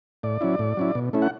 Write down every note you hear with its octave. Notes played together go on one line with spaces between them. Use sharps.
A2 D5
F#3 C#4 E4
A2
F#3 C#4 E4
B2
A3 C#4 E4
F#5